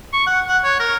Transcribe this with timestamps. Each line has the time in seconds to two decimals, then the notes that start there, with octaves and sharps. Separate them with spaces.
0.13 C#6
0.26 F#5
0.48 F#5
0.64 C#5
0.80 A#4